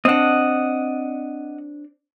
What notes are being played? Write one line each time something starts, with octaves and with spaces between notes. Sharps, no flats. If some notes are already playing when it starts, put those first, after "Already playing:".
C4 D4 D#5 F#5